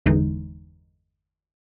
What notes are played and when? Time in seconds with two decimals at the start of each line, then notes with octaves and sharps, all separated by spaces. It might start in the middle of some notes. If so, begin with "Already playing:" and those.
0.06 G1 E2 D3 E3 G#3 D#4